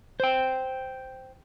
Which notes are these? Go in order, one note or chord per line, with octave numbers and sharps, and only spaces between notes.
C5 G5